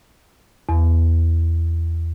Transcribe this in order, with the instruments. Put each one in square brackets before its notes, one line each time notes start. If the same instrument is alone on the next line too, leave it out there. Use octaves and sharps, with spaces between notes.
[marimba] E2